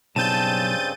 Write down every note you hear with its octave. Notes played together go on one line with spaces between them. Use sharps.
B1 G2 C#3 C4 A5 G6 A6 D#7